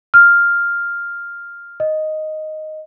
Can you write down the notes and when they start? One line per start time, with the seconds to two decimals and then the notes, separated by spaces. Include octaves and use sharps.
0.14 F6
1.80 D#5